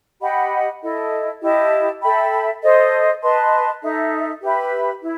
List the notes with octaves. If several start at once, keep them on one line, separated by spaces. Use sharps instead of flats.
G4 D#5 F#5 B5
E4 A4 D#5
E4 G4 D#5 A5
A4 E5 G5 B5
A4 C5 D#5
B4 D#5 A5 C6
D#4 A4 E5
G4 B4 E5 B5
E4